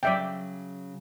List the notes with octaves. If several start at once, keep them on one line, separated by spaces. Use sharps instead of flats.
C#3 F#3 D5 E5 G5